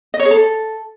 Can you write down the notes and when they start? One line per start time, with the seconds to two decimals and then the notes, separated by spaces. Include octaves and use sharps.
0.14 D#5
0.19 C#5
0.25 G#4
0.31 A4